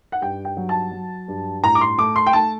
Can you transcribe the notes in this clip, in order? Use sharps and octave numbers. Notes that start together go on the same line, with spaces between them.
F#5
G2 G5
G5
F#3
A5
F#3
G2
A2 A#5
D6
C6
A3 D6
C6
G5
A3 A5